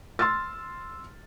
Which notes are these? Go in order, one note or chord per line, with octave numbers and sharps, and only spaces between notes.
C6 E6 F6 A6